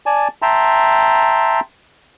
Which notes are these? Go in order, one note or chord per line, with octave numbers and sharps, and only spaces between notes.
D5 G#5 A5
E5 G5 A5 A#5 C6